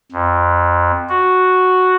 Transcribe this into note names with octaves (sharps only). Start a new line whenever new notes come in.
F2
F#4